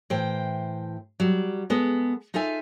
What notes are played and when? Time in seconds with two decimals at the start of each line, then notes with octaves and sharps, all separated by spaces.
0.10 A2 E3 C5 G5
1.20 F#3 G3
1.70 G#3 B3 A4
2.34 D#4 F4 A4 E5 G#5